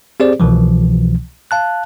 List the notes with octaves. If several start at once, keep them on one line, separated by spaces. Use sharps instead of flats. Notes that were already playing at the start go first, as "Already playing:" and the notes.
C4 G4 G#4 C5 D5
C2 B2 E3 F3
F5 A5 F#6